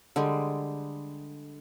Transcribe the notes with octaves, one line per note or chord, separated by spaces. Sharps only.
D3 G3 G#3